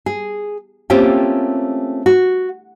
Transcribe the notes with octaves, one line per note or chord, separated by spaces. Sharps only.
G#4
A3 A#3 C4 C#4 F4 G4
F#4